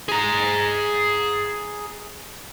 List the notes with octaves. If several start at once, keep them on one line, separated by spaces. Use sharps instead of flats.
G#4 A#5